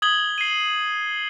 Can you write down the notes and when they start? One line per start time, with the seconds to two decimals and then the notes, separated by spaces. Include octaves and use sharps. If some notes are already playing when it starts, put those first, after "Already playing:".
0.02 D#6 G#6 F#7 G7
0.38 C7 D#7